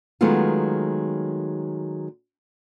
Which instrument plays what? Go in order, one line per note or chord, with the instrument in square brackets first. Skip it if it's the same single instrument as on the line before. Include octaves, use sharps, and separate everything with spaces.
[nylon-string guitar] D#3 F#3 G#3 A3 B3 F4